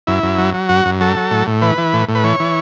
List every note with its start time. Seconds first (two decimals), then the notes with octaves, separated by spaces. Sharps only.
0.07 F#2 E4
0.23 F#2
0.38 F#3
0.54 F#3
0.69 F#2 F#4
0.85 F#2
1.00 F#3 A4
1.16 F#3
1.31 A2
1.47 A2
1.62 E3 B4
1.78 E3
1.93 A2
2.09 A2
2.15 B4
2.24 E3 C#5
2.40 E3